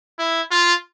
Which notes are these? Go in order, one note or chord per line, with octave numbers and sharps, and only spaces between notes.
E4
F4